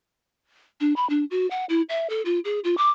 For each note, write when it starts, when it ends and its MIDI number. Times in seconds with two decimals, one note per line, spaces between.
0.80 0.93 62
0.96 1.08 83
1.09 1.25 62
1.31 1.48 66
1.50 1.65 78
1.69 1.81 64
1.89 2.09 76
2.09 2.22 69
2.25 2.39 65
2.45 2.59 68
2.64 2.77 65
2.77 2.90 86